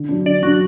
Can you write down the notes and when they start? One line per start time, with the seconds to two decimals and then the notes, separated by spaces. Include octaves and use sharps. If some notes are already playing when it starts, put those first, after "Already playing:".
Already playing: D3
0.09 F#3 D4
0.25 D3 D5
0.42 F#3 D4 F#4